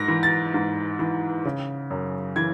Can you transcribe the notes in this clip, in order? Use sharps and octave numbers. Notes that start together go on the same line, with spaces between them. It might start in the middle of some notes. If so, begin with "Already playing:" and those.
Already playing: G#2 A#6
E3
A6
G#2
E3
C#3
F#2
E3 G#6